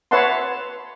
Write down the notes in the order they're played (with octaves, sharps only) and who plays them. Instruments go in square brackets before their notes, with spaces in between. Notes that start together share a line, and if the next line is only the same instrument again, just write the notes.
[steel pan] B4 C#5 E5 F#5 A5 C6